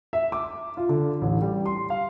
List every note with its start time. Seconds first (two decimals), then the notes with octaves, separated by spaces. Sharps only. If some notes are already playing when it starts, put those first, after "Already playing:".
0.13 E5
0.32 D6
0.77 F4
0.89 D3
1.22 A1
1.42 G3
1.66 C6
1.90 F5